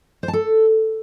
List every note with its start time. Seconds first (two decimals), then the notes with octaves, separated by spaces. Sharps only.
0.23 C5
0.28 A5
0.33 A4